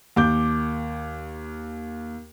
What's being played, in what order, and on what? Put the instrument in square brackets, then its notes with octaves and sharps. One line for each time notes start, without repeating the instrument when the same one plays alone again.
[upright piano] D#2 D6 G6